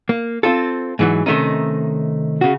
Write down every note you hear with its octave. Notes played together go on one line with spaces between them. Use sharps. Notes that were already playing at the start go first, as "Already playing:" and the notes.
A#3
C4 F4 A4
G#2 E3 F#3
C3 D#3 A3 C#4 D#4
C#3 F#4